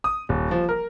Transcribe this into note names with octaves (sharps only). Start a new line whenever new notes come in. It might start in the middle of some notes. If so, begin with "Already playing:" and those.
D#6
D#1
F3
A#4